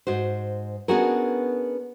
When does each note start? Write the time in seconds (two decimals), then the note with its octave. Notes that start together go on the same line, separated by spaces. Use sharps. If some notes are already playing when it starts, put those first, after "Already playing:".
0.07 G#2 F#4 C5
0.88 B3 C#4 D4 F#4 G#4 A#4